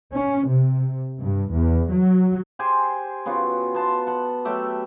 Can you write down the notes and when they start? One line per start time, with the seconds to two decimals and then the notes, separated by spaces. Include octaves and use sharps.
0.15 C#4
0.49 C3
1.22 G2
1.53 E2
1.92 F#3
2.59 G4 G#4 C5 G#5
3.26 C#3 B3 F4 F#4
3.74 B3 A5 C6
4.07 F#5 A5
4.45 F#3 A3 G4 E5